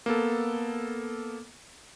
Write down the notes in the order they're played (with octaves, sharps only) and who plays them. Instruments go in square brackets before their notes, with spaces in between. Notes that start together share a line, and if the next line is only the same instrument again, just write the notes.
[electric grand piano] A#3 B3 A4